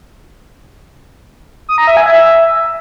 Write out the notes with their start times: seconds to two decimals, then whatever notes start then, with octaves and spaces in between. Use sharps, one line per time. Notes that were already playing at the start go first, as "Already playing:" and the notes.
1.69 D#6
1.78 A#5
1.87 E5
1.97 G#5
2.06 E5